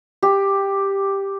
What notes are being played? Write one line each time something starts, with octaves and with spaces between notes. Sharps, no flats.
G4